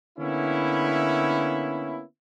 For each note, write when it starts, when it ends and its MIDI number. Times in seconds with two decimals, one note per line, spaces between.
0.19 2.03 50
0.19 2.03 58
0.19 2.03 59
0.19 2.03 61
0.19 2.03 64